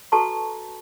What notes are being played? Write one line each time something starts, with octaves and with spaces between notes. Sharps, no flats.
F#4 A4 B4 A5 A#5 C#6